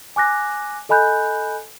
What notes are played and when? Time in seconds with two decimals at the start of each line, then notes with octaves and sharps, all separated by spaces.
0.16 G#5 D6 F#6 A#6
0.89 A4 D#5 G#5 B5 F#6 G6